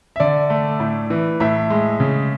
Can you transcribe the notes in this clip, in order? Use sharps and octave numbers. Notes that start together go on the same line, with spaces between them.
E5
D3 D5
A3
A2
E3
A2 E5
G#3
C#3